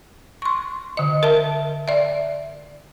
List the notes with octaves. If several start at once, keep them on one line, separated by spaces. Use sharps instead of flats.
C6 C#6
D3 D#5
A#4 E5 A5
D5 E5